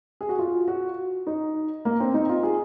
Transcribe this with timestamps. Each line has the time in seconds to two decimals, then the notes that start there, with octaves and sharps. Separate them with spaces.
0.21 G#4
0.29 F#4
0.39 F4
0.68 F#4
1.27 D#4
1.85 A#3
2.00 C4
2.14 D#4
2.29 F4
2.43 G#4